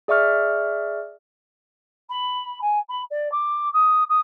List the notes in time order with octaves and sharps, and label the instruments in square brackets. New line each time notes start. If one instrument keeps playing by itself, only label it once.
[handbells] G#4 D5 E5 C#6 F6
[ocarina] B5
G#5
B5
D5
D6
D#6
D#6